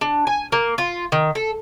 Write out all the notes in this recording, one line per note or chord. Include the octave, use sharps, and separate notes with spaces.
D4
G#5
A#3
F4
D#3
A4